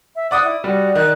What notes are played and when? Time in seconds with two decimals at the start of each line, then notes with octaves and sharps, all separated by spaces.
0.16 E5
0.31 D5 F#5 D6 D#6
0.44 E4
0.64 G3 F#4 D5
0.95 D#3 F#6